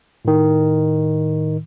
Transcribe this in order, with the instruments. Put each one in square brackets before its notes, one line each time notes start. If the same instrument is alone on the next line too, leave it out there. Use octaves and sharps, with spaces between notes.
[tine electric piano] A2 D#3